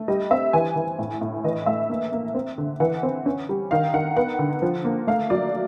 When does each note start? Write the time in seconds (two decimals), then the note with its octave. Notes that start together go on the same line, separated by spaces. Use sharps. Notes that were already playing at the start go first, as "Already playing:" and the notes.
Already playing: A3
0.08 G3 D#5
0.31 C4 E5
0.53 E3 G#5
0.76 E3
0.99 A2
1.21 A2
1.44 E3 D#5
1.66 A3 E5
1.90 A#3
2.12 A#3
2.34 C4
2.58 D3
2.80 E3 F#5
3.03 C4
3.26 C#4
3.49 G3
3.71 D#3 F5
3.93 D#3 F#5
4.17 B3 F#5
4.39 D3
4.62 F3
4.85 A#3
5.07 A3 F5
5.30 F#3 D5